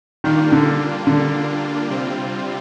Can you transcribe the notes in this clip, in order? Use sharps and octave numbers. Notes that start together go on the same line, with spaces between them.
D#3 G3 A#3 D4 F4
D3
D3
C3 G3 C4 F4